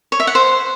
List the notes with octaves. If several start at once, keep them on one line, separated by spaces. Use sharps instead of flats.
C#5
E5
F#5
C5